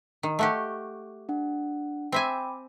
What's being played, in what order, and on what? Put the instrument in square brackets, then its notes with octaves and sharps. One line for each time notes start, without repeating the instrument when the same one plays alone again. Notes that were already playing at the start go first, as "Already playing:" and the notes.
[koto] D#3
A3 F#4 G4
[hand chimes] D4 F#5
[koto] C4 E5 G#5 [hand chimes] G5 B5 D6